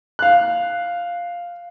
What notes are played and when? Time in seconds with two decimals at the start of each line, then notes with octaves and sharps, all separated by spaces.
0.19 F5 F#6